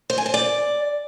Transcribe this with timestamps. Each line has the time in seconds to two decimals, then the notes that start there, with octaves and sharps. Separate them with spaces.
0.10 C5
0.18 G#5
0.26 C5
0.34 D5